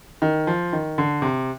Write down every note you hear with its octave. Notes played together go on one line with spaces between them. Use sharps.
D#3
F3
D#3
D3
C3